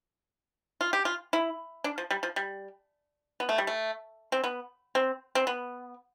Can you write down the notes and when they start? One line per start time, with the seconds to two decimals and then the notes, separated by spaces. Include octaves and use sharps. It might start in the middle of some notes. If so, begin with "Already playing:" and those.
0.81 F4
0.93 G4
1.05 F4
1.33 E4
1.84 D4
1.98 F3
2.11 G3
2.23 F3
2.36 G3
3.40 B3
3.49 A3
3.58 G3
3.67 A3
4.32 C4
4.44 B3
4.95 C4
5.35 C4
5.47 B3